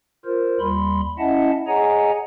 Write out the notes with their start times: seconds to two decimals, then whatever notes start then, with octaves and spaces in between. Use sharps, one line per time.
0.25 F4 A#4 C5
0.60 D#2 G3 B5 C6
1.18 C#4 E4 D#5 E5 F#5 A5
1.68 G#4 C#5 D#5 F#5 G#5 A#5